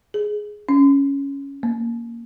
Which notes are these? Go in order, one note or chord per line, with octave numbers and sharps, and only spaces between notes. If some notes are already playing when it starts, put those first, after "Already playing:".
G#4
C#4
A#3